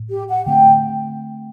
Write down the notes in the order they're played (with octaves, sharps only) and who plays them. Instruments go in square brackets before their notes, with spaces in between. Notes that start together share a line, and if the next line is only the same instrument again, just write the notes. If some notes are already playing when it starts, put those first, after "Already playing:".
Already playing: [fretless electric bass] A2
[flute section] G4
F#5
[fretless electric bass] D3 A3 C4 [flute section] G5